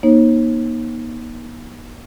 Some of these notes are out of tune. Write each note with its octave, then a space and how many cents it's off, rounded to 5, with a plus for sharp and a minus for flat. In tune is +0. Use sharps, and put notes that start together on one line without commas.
A#3 +45 D#4 +0 C#5 -40